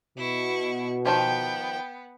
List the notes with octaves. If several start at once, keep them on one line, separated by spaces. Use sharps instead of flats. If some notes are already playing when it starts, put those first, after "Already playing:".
B2 E4 C#6
D#3 F3 B3 G4 G5